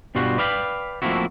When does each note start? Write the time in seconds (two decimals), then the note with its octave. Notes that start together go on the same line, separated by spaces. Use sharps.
0.15 G2 B2 G3 F4 F#4 C5
0.38 B4 D5 F5 G5 A5 B5
1.02 F3 A3 A#3 C4 E4 F#4